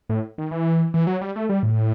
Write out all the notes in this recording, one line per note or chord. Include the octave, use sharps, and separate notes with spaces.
A2
D#3
E3
E3
F#3
G3
A3
G3
A2